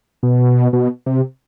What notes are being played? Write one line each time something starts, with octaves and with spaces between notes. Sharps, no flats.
B2
B2
C3